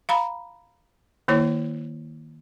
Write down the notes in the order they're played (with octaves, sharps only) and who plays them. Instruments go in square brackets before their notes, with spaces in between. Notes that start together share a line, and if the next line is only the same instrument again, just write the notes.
[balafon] F5 A#5 B5
D#3 A#3 E4 C#5